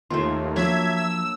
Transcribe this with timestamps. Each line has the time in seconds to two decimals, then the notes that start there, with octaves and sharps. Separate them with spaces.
0.10 D#2 A3 F4 C6
0.56 F3 F#3 A#3 D4 E5 G#6
0.97 E6